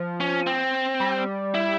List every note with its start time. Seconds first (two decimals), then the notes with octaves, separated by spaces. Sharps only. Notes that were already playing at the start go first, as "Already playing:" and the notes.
Already playing: F3
0.20 C#4
0.47 C4
1.00 G3
1.54 E4